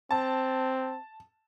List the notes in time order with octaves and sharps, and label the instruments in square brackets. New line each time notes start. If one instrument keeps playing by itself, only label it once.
[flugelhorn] C4 [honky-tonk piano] A5